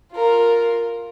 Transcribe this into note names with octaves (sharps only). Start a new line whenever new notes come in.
F4 A#4